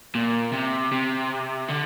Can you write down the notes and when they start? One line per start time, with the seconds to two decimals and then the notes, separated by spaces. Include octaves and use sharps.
0.15 A#2
0.53 C3
0.92 C3
1.68 D3